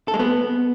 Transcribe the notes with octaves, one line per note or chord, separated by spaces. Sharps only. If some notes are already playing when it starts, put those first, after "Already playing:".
A4
G#3
B3